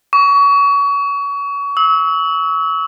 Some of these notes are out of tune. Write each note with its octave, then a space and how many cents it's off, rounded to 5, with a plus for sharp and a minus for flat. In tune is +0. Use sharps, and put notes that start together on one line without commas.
C#6 +30
E6 -30